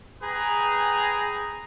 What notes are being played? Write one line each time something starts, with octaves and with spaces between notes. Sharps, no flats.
G#4 B4 G5 A#5